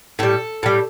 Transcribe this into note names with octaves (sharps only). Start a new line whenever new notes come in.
A2 G3 A4
A2 G3